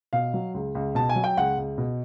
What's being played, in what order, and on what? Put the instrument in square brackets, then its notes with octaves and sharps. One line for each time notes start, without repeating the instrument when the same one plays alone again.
[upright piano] B2 F5
F#3
C#2
C#2
B2 A5
G#5
F#3
G5
C#2 F#5
C#2
B2